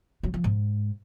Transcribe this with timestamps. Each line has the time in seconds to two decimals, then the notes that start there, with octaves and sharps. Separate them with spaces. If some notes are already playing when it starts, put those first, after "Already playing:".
0.23 F#3
0.34 F3
0.44 G#2